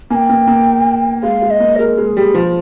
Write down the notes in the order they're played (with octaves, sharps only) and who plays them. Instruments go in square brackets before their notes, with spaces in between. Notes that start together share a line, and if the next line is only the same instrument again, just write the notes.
[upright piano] A#3 [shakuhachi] G#5
[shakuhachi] G5
[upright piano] A#3
A#3
[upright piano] G#3 [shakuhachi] F5
[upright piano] G#3
[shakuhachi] D#5
[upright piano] A#3
[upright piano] G#3 [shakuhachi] A#4
[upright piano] G#3
[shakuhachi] G#4
[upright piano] G3
F3